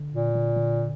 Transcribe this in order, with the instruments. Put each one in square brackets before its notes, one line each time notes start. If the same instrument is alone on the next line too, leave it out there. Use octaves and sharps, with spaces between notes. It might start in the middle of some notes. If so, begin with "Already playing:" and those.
Already playing: [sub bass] D3
[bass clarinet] A#2
[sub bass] D3
D3